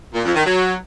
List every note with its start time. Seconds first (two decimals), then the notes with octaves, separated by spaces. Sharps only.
0.14 A#2
0.25 F2
0.35 D#3
0.46 F#3